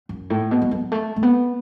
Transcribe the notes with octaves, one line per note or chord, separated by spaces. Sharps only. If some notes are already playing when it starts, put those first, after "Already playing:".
F#2
A2
B2
G3
F#3
A3
A3
B3